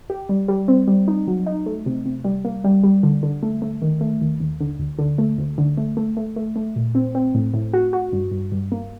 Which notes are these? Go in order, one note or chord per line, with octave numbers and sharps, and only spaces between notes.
G4
G3
G3
C4
G3
D#4
F#3
D#4
A3
C3
C3
G3
A#3
G3
G3
D3
D3
A3
A3
D#3
A3
D#2
D#2
D3
D2
D3
A3
D2
D3
A3
A3
A3
A3
A3
A#2
C4
C4
A2
A2
F#4
F#4
G2
G2
G2
A#3